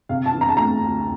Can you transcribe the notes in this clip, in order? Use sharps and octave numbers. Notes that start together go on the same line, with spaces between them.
C3 F5
A5
E3
A#5
A5
A3 A#5
D2